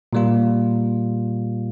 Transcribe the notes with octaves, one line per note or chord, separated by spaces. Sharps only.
A#2 G3 A#3 F4